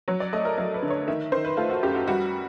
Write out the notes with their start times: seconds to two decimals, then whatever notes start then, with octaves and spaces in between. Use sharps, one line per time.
0.08 F#3 C#5
0.20 D5
0.33 A3 D#5
0.45 A#4
0.57 F#3 A#4
0.74 B4
0.83 D3
0.90 C#5
1.08 D#3 E5
1.32 D#3 C5
1.45 B4
1.57 A3 F4
1.70 F#4
1.83 F#2 G4
1.95 F#4
2.07 G3 F#4